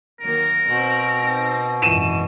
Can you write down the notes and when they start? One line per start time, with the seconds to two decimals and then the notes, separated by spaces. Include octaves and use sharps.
0.21 D#3 F#3 A#3 A#4
0.67 B2 C4 F#4
1.22 C4 D#4 A#6
1.82 G#1 F#2 E3 D#7 E7